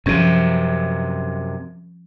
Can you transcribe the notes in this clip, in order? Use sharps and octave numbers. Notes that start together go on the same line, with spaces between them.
F#2 C3 F3 G3 C#4